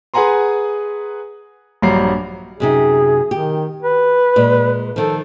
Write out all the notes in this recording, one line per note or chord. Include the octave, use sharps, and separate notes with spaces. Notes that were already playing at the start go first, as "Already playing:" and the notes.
G#4 B4 F#5 G#5 A#5 C6
A#1 G2 F#3 G3 A#5 C7
F#2 C3 D#4 G#4
D#3 G4
B4
A#2 G#3
D#3 F3 A4